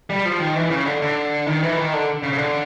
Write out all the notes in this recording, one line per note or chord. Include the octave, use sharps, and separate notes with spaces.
G3
F3
D#3
E3
C#3
D3
D3
D#3
E3
D#3
D3
C#3
C#3
D3